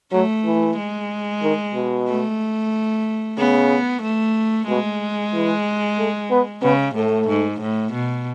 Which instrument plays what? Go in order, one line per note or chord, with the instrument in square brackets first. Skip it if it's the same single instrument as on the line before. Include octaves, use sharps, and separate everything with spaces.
[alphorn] F#3 [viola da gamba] A3
[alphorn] E3
[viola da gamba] G#3
[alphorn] D#3
B2
[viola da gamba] A3
[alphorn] C#3 [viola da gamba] B3
[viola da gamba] A3
[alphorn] B2 [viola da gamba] G#3
[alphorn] E3
A3
B3
[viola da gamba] C#3 [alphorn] B3
[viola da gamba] A2 [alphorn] A3
[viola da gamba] G#2
A2
B2